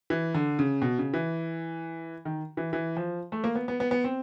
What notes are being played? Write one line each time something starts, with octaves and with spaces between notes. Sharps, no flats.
E3
D3
C#3
B2
C#3
E3
D#3
E3
E3
F3
A3
A#3
B3
B3
B3
B3
C4